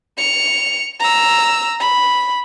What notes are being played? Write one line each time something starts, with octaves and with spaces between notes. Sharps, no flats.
C#7 F7
A#5 E6
B5